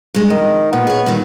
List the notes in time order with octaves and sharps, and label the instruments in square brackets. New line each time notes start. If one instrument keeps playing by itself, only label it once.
[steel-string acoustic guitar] G2 G#3
[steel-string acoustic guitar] F2 [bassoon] D#3
[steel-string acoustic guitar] A#2 [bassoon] B3
[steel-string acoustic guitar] G#4 C#5
G2 A#2 D#3